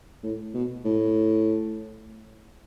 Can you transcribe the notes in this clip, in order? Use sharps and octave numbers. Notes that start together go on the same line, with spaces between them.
A2
B2
A2